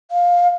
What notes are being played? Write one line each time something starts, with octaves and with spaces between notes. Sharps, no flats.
F5